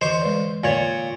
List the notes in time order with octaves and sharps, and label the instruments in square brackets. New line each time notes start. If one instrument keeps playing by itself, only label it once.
[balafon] D3 E3 D#5 [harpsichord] C5 C#6
[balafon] G#3 B4 D5
[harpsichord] A#2 C#5 [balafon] D3 D5